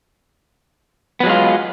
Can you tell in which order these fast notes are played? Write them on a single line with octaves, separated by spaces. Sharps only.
B3 F#3 G#3 F4